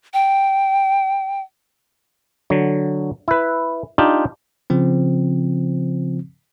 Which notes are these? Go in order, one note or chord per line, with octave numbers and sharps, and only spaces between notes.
G5
D3 F#3
E4 B4
D4 D#4 F4 G4
C#3 F3 C4